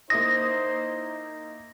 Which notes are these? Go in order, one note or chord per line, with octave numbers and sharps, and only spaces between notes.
A#3 D#4 E4 C5 D#6 A#6